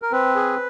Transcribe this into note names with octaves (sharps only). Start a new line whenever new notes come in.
A#4
C4 B4
G#4